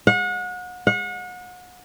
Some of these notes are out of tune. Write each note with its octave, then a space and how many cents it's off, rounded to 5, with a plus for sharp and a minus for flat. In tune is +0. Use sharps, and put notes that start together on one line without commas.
F#5 -35
F#5 -35